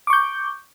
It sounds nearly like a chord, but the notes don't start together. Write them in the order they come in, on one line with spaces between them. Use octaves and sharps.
D6 C#6 G6